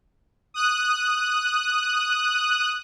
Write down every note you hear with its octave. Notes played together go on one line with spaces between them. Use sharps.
D#6 F#6